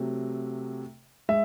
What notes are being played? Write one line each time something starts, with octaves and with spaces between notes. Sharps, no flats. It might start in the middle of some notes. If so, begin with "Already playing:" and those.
Already playing: C3 F#3 A3
G#3 E5